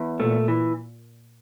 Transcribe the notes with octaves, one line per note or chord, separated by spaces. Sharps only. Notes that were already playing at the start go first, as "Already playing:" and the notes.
Already playing: E2
A#2 A3
E3